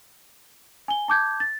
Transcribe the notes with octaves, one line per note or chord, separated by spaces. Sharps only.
G#5 G7
A5 D6 G6 G#6
A6